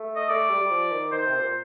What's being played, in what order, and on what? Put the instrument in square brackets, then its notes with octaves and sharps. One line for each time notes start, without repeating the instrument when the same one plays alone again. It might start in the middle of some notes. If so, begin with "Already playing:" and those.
Already playing: [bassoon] A3
[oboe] D#5
[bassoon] A3 [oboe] D5
[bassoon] G3
G3
F3
D#3
[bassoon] D#3 [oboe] C5
[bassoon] C3
A#2